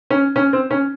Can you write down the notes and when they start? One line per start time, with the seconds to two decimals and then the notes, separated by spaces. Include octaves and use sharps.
0.10 C#4
0.36 C#4
0.53 C4
0.71 C#4